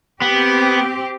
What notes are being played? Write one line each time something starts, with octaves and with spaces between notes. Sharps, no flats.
B3 C4 G4